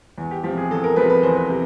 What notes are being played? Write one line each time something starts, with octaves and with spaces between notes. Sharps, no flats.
E2
G4
F3 G4
C3
G#4
E2 A4
A#4
C3 F3 B4
B4
E2 C5
B4
C3